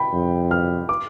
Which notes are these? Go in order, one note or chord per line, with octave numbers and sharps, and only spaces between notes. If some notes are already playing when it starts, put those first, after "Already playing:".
Already playing: G5 B5
F2
F6
D6